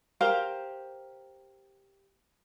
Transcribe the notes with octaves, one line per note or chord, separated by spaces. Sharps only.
G4 A#4 C5 F5